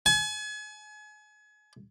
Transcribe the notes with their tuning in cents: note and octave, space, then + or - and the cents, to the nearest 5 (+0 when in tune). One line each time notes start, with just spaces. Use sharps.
G#5 +35